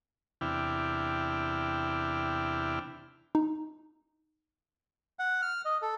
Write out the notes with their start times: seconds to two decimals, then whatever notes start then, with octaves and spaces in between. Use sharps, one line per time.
0.41 E2 C3 D4 E4 G5 F6
3.35 D#4
5.19 F#5
5.42 F6
5.65 D#5
5.82 A4